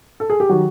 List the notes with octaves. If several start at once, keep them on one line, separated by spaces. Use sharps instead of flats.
A4
G#4
G4
D#3 F#3 F#4